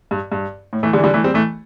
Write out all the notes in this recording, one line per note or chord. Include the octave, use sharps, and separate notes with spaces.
G2
G2
A2
E3 A3
D3 G3
E3
D3 G3
E3 A3
G3 C4
E3 A3